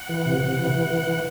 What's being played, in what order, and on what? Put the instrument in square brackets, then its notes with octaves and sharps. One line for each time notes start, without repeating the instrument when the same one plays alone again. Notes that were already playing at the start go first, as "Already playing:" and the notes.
Already playing: [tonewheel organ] F#5
E3
C3
C3
E3
E3
E3
E3